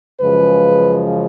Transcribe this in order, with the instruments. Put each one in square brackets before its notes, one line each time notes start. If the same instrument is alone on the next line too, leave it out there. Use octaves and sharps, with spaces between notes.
[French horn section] F#2 C#3 F3 G#3 B4